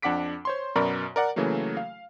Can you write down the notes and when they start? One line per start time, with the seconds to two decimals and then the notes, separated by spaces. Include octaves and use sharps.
0.02 F2 D4 F#5 D6 B6 D7
0.45 C5 C#5 C6
0.76 F#2 B2 A#4 D5 B5 C#6
1.16 A#4 D5 F#5
1.36 C#3 E3 F#3 A3 A#3
1.77 F5